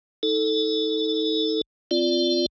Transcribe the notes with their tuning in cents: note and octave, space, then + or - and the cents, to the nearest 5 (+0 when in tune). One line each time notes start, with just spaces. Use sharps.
D#4 +35 A4 +0
C4 -10 F4 -5 D5 +0